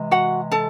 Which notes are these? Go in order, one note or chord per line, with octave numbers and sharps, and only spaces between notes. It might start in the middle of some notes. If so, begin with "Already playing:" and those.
Already playing: C3 E3 G#3
F#4 F#5
A4 A5